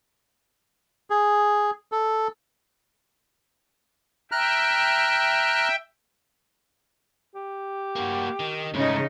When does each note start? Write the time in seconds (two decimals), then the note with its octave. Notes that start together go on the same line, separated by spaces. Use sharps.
1.10 G#4
1.92 A4
4.32 E5 G5 A#5 F6 F#6
7.35 G4
7.96 A#3 F#4
8.40 D#3
8.74 G#2 C#3 A3 D#4